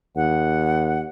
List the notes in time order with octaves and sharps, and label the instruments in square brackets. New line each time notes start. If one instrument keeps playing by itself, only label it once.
[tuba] D#2 [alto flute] F#5